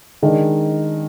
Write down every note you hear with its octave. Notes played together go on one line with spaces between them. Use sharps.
D#3 G#3 D4